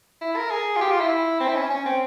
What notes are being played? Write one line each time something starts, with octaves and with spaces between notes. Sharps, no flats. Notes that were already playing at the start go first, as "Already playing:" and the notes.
E4
A#4
G#4
F4
G4
F4
E4
C4
E4
C#4
C#4
C4